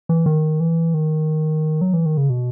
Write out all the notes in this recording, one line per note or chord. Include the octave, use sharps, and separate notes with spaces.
E3
D#3
E3
D#3
F#3
E3
D#3
C#3
B2